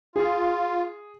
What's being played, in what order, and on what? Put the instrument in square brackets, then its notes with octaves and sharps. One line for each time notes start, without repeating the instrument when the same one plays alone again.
[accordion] F4 [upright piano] G#4